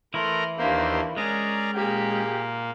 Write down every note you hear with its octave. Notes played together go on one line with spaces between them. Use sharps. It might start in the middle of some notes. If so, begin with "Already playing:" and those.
E3 A3 E4 A#4 A#5 C6
D#2 A#3 D4 G4 C5
G#3 C#4 G#4 A#4 D5 A#5
A#2 A#3 G4 G#4